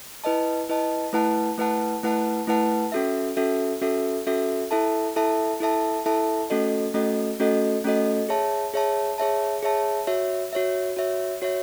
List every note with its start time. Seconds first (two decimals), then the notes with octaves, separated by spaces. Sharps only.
0.24 E4 B4 D#5 A5
0.69 E4 B4 D#5 A5
1.13 A3 E4 B4 F#5 A5
1.58 A3 E4 B4 F#5 A5
2.03 A3 E4 B4 F#5 A5
2.47 A3 E4 B4 F#5 A5
2.92 C#4 F#4 A4 E5
3.37 C#4 F#4 A4 E5
3.82 C#4 F#4 A4 E5
4.27 C#4 F#4 A4 E5
4.71 E4 A4 E5 A5
5.16 E4 A4 E5 A5
5.60 E4 A4 E5 A5
6.06 E4 A4 E5 A5
6.50 A3 C#4 F#4 A4 D#5
6.94 A3 C#4 F#4 A4 D#5
7.40 A3 C#4 F#4 A4 D#5
7.84 A3 C#4 F#4 A4 D#5
8.29 G#4 C#5 E5 A5
8.74 G#4 C#5 E5 A5
9.18 G#4 C#5 E5 A5
9.63 G#4 C#5 E5 A5
10.07 F#4 C#5 E5
10.53 F#4 C#5 E5
10.97 F#4 C#5 E5
11.42 F#4 C#5 E5